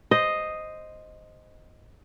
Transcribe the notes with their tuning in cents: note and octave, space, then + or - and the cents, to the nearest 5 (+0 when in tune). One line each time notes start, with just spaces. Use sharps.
C5 +0 D#5 +0